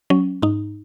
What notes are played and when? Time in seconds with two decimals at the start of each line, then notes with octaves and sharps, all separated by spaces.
0.10 F#3 C#4
0.42 G#2 D#4